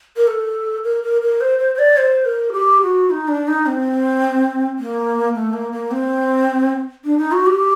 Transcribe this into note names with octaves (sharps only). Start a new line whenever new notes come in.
A#4
A4
A#4
A#4
A#4
C5
C5
C5
D5
C5
A#4
G4
F#4
D#4
D4
D#4
C4
A#3
A3
A#3
A#3
C4
D4
D#4
F#4
G4